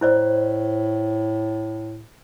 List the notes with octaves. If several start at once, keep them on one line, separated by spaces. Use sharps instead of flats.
A2 E4 C5 D5